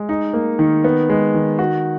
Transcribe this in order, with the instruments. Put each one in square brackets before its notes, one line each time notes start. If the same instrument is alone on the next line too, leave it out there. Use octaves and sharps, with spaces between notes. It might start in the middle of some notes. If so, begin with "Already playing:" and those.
Already playing: [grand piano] G#3
D#4
A#3
D#3
B3
G#3
D#3
F#4